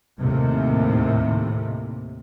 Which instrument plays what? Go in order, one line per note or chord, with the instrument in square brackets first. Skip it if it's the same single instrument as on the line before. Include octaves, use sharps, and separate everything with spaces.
[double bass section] D#2 A2 C3